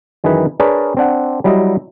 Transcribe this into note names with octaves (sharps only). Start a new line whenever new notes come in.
F#2 D#3 E3 G#4 B4
D4 G#4 A#4 B4 C#5 D5
C4 D4 F#5
F#3 G3 E4 G4 D#5